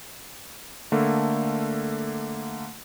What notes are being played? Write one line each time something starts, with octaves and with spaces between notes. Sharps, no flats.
D3 A3 A#3